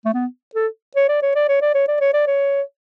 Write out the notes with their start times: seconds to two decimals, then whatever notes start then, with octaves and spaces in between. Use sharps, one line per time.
0.05 A3
0.14 B3
0.55 A4
0.96 C#5
1.08 D5
1.22 C#5
1.35 D5
1.49 C#5
1.61 D5
1.74 C#5
1.88 D5
2.00 C#5
2.13 D5
2.27 C#5